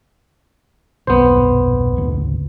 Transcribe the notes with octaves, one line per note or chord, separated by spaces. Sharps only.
D#1 B1 F#2 B3 C5
G#1 D2 C#3